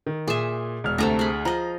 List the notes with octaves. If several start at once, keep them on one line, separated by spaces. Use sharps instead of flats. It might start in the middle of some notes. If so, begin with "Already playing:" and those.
D#3
A#2 G#4 E5
E1 F6
D2 C3 A3 A#5
G#4 B5
F3 D#5 A#5